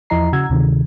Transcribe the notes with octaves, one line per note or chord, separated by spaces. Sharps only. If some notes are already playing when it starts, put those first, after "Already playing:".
E2 F3 E4 D#5 A#5 C7
C#3 F#4 F#5 A#5 E6 G#6
D2 C3 D#3